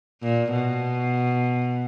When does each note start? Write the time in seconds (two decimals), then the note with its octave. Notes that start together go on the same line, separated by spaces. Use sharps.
0.22 A#2
0.52 B2